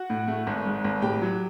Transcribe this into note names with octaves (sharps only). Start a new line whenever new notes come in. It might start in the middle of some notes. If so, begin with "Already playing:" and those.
Already playing: F#4 F#5
A2
A3
G#1
G#2
G#1
A2 G4 G5
F#3